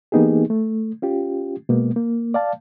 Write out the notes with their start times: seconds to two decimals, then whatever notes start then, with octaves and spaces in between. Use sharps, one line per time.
0.12 E3 A#3 B3 D#4 G4 G#4
0.50 A3
1.02 C#4 F4 G4
1.69 B2 G#3 A#3 B3
1.96 A#3
2.34 D5 F5 A5